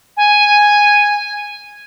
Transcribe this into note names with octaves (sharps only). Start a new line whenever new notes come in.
G#5